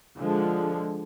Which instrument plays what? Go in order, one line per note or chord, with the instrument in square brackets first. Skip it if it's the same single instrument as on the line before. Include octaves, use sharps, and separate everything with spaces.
[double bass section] D3 F3 G#3